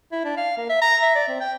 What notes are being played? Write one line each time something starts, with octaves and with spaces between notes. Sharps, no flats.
E4
D4
F5
A#3
E5
A#5
E5
D5
C4
G5